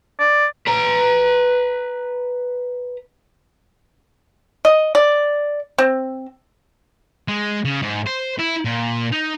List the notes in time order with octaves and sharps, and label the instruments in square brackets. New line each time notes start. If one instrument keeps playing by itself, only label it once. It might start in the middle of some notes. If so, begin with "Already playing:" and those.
[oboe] D5
[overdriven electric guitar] B4 A#5
[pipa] D#5
D5
C4
[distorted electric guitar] G#3
C#3
G#2
C5
E4
A#2
D#4